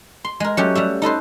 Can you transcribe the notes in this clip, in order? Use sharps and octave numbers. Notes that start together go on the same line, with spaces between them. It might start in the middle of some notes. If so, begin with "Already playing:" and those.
C6
G#3 A#4
F#3 A3 C#4 G4
G3 F#4 E5
D#4 A4 B4 C5